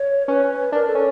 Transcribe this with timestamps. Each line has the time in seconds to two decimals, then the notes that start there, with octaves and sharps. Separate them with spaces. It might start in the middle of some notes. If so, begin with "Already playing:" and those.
Already playing: C#5
0.27 C#4 B4
0.72 D4 A#4
0.88 A4
0.95 C#4